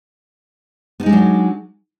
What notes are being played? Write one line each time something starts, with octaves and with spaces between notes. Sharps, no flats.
F#3 G#3 B3 D4 D#4